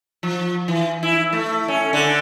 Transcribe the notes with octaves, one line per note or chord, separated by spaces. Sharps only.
F3
E3
E4
A3
C#4
D3